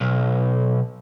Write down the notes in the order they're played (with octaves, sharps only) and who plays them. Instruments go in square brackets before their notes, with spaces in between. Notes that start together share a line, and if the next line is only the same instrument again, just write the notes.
[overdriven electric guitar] B1